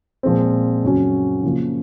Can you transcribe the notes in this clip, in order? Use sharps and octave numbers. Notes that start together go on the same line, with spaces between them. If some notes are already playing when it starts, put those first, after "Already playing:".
A#2 F3 G#3 C4
F#2 C#3 F#3 C#4 F#4
C#3 F3 A#3 F4